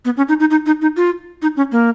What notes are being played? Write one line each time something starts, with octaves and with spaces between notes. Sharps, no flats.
B3
C#4
D#4
D#4
D#4
D#4
D#4
F4
D#4
C#4
A#3